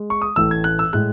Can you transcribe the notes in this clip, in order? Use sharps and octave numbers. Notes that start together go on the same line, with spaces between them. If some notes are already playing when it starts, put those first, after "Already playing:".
Already playing: G#3
C#6
D#6
A1 A2 E3 A3 E6
G#6
F#6
E6
A2 G#3 F#6